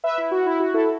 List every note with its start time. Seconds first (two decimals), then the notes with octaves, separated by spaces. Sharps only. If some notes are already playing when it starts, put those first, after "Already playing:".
0.04 B4 E5
0.18 E4
0.31 F#4
0.46 E4
0.60 F#4
0.74 E4 A4